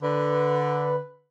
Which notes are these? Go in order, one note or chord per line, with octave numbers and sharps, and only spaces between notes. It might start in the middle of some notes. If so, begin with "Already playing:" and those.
D3 B4